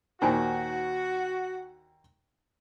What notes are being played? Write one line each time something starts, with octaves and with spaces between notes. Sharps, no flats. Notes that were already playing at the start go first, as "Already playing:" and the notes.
D#2 A#2 D#3 D#4 F#4 C5 G#5